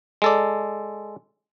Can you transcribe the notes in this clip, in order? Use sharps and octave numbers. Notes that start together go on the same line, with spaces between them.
G#3 A4 D5